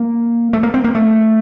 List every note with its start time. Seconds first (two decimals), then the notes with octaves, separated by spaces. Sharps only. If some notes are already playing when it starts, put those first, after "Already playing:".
Already playing: A#3
0.53 A3
0.63 A#3
0.74 C4
0.84 A#3
0.95 A3